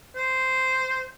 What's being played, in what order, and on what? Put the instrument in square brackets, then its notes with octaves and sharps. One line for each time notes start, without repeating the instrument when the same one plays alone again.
[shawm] C5